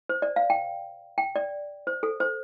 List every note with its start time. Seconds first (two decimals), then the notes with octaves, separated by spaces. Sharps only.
0.09 C5
0.22 D5
0.36 F5
0.50 G5
1.18 G5
1.36 D5
1.87 C5
2.03 A4
2.20 C5